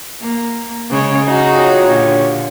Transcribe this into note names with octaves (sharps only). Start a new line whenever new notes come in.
A#3
C#3 G#3 C#5
C#3 D#4 F#4 G#4
F4 G4 C#5
A#2 D3